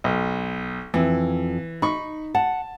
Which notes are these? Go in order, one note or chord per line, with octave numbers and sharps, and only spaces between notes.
B1
F2 E3
D#4 B5 C#6
F#5 A5